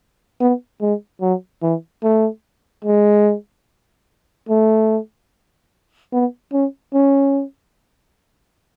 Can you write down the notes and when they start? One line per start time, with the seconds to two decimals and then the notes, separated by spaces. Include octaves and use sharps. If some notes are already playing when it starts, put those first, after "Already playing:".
0.41 B3
0.81 G#3
1.21 F#3
1.62 E3
2.03 A3
2.85 G#3
4.49 A3
6.13 B3
6.53 C#4
6.94 C#4